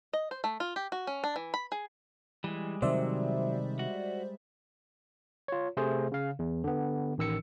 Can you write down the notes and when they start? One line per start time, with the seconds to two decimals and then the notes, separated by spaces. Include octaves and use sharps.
0.13 D#5
0.31 C5
0.44 A3
0.60 F4
0.76 G4
0.92 F#4
1.07 C#4
1.24 D4
1.36 E3
1.54 B5
1.72 G#4
2.44 E3 G3 G#3
2.82 C3 D#3 F#3 C5 D5 E5
3.79 F#4
5.48 F4 C#5
5.77 C3 A3 G#4 C5
6.12 C#3 F5
6.39 E2
6.64 D3 B3
7.18 A1 D#3 E6 C#7